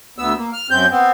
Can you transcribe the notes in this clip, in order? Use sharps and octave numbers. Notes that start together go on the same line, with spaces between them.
D2 B3 E6
A#3
F6
F#2 C4 G6
B3 C4